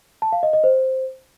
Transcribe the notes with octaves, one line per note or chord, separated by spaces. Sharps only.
A5
F5
D#5
D#5
C5